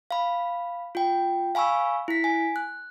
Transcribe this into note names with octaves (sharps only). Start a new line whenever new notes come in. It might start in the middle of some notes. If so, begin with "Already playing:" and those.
F5 B5
F4 G5
F5 G#5 B5 C#6 E6
E4 B6
G#5
F#6